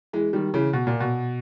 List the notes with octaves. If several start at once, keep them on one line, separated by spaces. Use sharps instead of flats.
E3 G#3
D#3 G3
C#3 E3
B2
A#2
B2